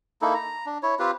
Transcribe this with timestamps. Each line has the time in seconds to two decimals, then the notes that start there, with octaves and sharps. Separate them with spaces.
0.22 A#3 D#4 E4 A4
0.34 A#5
0.66 D4
0.83 E4 C#5
0.99 C4 F4 G4 B4